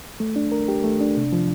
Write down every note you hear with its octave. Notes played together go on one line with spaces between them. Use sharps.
A3
D4
A#4
G4
A3
D4
C3
F3